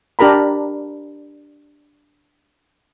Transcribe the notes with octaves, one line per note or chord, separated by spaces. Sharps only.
D4 G4 A#4 A#5 B5